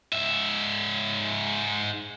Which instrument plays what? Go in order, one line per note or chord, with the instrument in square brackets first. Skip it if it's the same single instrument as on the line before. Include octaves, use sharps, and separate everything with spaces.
[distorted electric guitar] G#2 E5